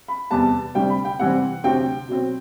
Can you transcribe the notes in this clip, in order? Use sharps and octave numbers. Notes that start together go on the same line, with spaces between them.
B5
E2 C3 G3 B3 A5
D2 C3 G3 C4 G5
B5
G5
C3 E3 G3 C4 F#5
D2 C3 F#3 C4 G5
B2 F#3 C4